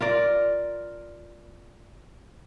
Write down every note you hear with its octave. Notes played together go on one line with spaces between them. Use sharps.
F4 A#4 D5